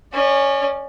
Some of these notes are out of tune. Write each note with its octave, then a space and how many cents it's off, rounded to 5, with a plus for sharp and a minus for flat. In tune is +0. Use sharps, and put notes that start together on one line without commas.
C#4 +0 D5 +35